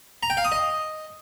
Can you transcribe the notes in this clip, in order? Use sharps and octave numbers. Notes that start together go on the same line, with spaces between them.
A#5
G5
F5
D#6
D#5